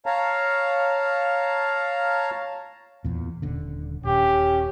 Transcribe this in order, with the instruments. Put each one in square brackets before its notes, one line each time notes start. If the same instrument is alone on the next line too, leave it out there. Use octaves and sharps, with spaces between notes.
[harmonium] C#5 F5 A5 A#5
[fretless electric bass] E2 A#2
D#1 D3
[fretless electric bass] D#1 [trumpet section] C#4 G4